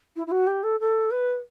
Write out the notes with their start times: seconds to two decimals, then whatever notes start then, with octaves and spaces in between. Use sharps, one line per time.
0.16 E4
0.27 E4
0.31 F#4
0.47 G4
0.63 A4
0.80 A4
1.11 B4